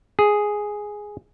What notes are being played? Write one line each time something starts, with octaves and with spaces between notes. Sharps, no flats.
G#4